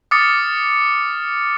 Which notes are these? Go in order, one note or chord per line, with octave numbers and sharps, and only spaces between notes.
D6 D#6 F6 A6 C#7